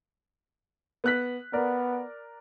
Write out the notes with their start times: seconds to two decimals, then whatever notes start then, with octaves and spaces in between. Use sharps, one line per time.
1.04 B3 F#6 B6
1.53 B3 A#4 D5